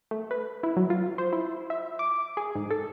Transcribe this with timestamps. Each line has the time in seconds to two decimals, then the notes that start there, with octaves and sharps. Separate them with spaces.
0.11 A3
0.31 B4
0.63 E4
0.77 F#3
0.90 F4
1.18 C5
1.33 E4
1.70 E5
1.99 D6
2.37 G#4
2.55 G#2
2.70 A4